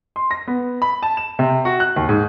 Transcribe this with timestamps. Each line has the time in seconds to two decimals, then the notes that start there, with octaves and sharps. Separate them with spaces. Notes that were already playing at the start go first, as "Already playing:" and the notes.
0.16 C6
0.31 A#6
0.47 B3
0.82 B5
1.03 A5
1.17 E7
1.39 C3
1.65 F#4
1.80 F#6
1.96 D#2
2.09 G#2